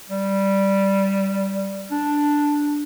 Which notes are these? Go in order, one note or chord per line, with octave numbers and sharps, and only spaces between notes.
G3
D4